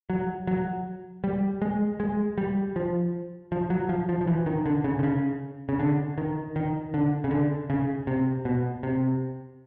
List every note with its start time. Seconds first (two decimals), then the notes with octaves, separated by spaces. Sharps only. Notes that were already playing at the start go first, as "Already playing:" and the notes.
0.10 F#3
0.47 F#3
1.24 G3
1.62 G#3
2.00 G#3
2.38 G3
2.76 F3
3.52 F3
3.70 F#3
3.89 F3
4.09 F3
4.21 F3
4.27 E3
4.46 D#3
4.66 D3
4.84 C#3
4.99 D3
5.03 C#3
5.69 C#3
5.79 D3
6.18 D#3
6.56 D#3
6.94 D3
7.24 C#3
7.31 D3
7.70 C#3
8.07 C3
8.45 B2
8.83 C3